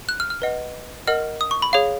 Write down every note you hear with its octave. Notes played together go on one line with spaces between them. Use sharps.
F#6
F6
F6
B4 D#5 F#5
A#4 D#5 F#5 F6
D#6
C#6
B5
G#4 C#5 F5